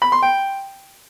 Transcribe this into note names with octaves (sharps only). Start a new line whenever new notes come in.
B5
C6
G5